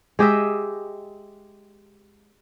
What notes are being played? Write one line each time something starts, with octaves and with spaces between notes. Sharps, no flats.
G#3 G4 D#5 E5